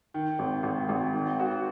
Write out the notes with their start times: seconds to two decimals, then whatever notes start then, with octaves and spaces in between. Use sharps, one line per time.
0.14 D#3
0.39 G#1
0.63 G#1
0.89 G#1
1.14 D#3
1.40 F#4